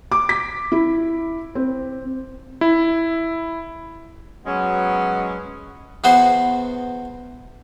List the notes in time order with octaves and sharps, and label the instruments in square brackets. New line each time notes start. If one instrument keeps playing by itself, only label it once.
[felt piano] D6
B6
E4
C4
[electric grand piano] E4
[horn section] F#3 G#3 C#4 [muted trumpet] B3
[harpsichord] E2 B3 F#4 G#4 C5 C6